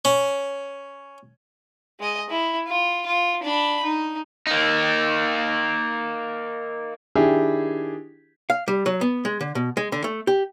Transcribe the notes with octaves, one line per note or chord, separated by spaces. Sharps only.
C#4
G#3 D#5
E4
F4
F4
D4 B5
D#4
A#3 D#4
D#3 D4 E4 G4 G#4
F5
G3
F#3
B3
G#3
D3
B2
G#3
D3
A3
G4